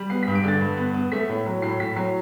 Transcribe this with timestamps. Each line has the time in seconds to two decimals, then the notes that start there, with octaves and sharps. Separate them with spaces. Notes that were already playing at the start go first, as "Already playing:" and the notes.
Already playing: G3
0.10 B3 C7
0.23 B6
0.27 G2
0.35 D7
0.44 D3 A6
0.61 G2
0.77 B3
0.94 B3
1.12 A3 B6
1.29 A2
1.46 F#3
1.62 A2 C7
1.80 A2 B6
1.96 F#3 C7